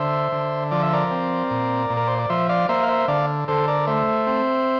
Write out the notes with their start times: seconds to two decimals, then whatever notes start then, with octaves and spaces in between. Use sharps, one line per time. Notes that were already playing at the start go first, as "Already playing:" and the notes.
Already playing: D3 C5 E5
0.32 D3
0.71 F3 D5
0.83 E5
0.93 A#4 D5
1.11 C4
1.51 A#2
1.90 A#2
1.97 A#4
2.08 C5
2.19 D5
2.30 F3 C5 E5
2.49 D5 F5
2.69 A#3 C5 E5
2.83 F5
2.88 C5 E5
3.08 D3 D5 F5
3.48 D3 A4 C5
3.68 A#4 D5
3.87 A3 C5 E5
4.27 C4